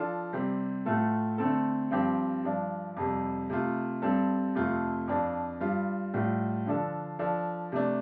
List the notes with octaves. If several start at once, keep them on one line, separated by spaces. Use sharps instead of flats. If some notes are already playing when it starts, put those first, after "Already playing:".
Already playing: F3 D4 F4 A4
C3 G3 C4
A2 A3 F4 A4
D3 A3 C4 A4
G2 F3 C4 G4
G2 F3 D4
F2 C3 G3
C3 A3 F4
G2 G3 C4 A4
F2 C3 A3 F4
F2 F3 D4
G2 G3 F4
A2 G3 F4
D3 F3 D4 A4
F3 D4 A4
C3 A3 D4